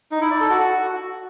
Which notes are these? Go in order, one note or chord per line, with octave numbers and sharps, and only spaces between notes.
D#4
E4
D5
A4
F#4